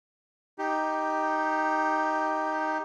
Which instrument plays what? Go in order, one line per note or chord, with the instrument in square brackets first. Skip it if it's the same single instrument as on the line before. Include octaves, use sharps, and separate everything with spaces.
[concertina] D#4 G4